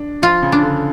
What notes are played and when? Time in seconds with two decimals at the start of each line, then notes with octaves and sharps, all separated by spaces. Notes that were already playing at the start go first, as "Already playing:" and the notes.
Already playing: D4
0.22 F3 F4
0.42 C#3
0.52 D4
0.62 D3